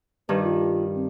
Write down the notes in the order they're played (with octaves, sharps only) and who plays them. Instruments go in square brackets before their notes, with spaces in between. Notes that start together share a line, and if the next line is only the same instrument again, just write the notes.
[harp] G2 D#3 [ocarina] B4
[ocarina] F4
C4